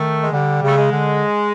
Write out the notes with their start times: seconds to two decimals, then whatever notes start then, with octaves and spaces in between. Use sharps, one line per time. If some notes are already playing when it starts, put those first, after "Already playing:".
Already playing: D#3 A3
0.22 G#3
0.32 D3 G3
0.63 C#3
0.68 A3
0.78 G#3
0.92 D3